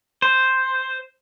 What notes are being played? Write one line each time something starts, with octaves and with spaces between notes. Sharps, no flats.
C5